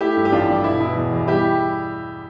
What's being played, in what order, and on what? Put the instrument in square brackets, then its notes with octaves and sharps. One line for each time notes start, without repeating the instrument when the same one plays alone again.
[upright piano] A3 E4 G4
G2
G4
A1 D4 F4
G2
B2 E4
B2 E4
E2
E2
G3 E4 G4